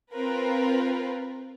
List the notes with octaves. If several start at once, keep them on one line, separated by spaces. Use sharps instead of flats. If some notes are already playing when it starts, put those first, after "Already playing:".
C4 F4 A#4 B4